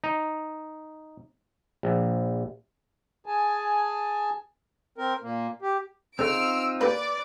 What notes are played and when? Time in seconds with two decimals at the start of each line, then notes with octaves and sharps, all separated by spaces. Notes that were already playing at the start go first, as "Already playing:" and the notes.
0.04 D#4
1.83 A#1
3.26 G#4 G#5 A5
4.98 C4 A#4
5.23 A#2 A#3
5.62 G4
6.19 C#3 C4 D#4 F4 A4 E6 F6 D7
6.81 A#3 G4 B4 D5 D6